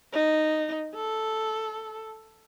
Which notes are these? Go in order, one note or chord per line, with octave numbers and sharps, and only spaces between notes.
D#4
A4